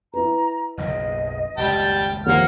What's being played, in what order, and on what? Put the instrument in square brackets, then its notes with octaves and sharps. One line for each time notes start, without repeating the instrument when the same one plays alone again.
[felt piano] E4 B4 [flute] A#5
[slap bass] F#1 B1 C#3 [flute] D#5
[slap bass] D#1 C#2 F#2 [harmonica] G3 G5 A5
[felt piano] D#2 F3 C7 [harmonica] A#3 F6 [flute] F#5